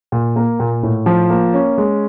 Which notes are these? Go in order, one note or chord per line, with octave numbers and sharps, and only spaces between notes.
A#2
A#3
A#2
A2
F3
A#3
C#4
G#3